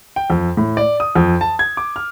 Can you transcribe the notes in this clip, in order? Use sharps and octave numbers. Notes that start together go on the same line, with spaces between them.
G5
F2
A2
D5
D#6
F2
A5
G#6
D6
F6